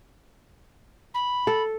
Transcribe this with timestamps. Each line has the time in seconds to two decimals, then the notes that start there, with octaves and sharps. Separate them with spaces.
1.14 B5
1.47 A4